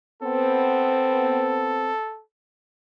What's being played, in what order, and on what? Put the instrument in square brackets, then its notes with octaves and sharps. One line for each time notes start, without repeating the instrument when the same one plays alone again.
[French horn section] B3 C4 [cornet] A4